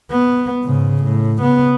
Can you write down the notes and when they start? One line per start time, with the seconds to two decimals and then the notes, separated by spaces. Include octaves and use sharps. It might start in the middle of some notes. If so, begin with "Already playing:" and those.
0.10 B3
0.63 G#2 C#3
1.03 A2
1.38 C#3 B3